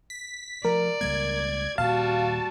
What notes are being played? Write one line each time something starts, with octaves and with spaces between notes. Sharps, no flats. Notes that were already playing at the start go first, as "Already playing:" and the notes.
B6
F3 A3 A#4 D5
C#2 G3 A#3 G#6
D#1 A#2 G3 F#4 F5 A5